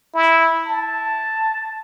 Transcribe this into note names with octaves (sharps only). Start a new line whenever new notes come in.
E4
A5